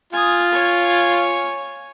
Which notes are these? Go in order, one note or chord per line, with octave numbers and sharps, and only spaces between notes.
F4 G#5 D#6
C#5 G#5